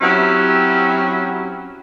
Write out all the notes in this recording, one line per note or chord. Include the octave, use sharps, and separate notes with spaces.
F#3 C4 C#4 E4 F#4 G4